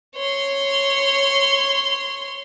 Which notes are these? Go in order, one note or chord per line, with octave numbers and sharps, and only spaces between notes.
C#5 C6